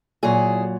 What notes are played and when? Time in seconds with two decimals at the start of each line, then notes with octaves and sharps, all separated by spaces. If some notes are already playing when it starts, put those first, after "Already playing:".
0.23 A#2 F#3 E4 G#4